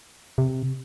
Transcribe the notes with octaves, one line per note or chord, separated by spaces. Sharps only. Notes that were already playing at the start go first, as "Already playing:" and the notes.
C3